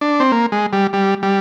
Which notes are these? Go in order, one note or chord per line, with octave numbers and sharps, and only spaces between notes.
D4
C4
A#3
G#3
G3
G3
G3